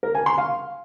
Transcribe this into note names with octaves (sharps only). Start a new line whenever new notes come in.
A#4
G#5
C6
F5